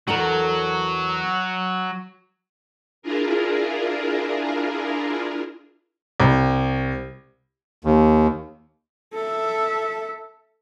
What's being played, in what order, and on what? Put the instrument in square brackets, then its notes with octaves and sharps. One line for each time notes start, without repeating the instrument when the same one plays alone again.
[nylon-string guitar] E2 A4 A#4 [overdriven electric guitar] F#3
[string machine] D4 E4 F4 G#4 A#4
[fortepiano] C2
[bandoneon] D#2
[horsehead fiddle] A4 E5